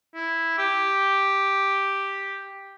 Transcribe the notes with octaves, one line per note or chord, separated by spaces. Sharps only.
E4
G4